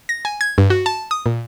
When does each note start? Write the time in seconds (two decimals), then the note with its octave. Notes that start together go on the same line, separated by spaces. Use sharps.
0.09 A#6
0.25 G#5
0.41 G#6
0.58 G2
0.70 F#4
0.86 A5
1.11 D#6
1.26 A#2